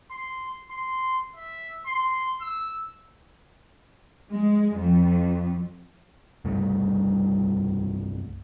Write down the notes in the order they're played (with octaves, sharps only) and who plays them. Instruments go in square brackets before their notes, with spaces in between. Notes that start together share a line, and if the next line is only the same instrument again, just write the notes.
[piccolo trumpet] C6
C6
E5
C6
E6
[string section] G#3
F2
[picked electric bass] C2 G2 G3 A3